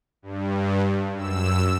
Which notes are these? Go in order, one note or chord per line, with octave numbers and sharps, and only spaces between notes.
G2
F#2 E6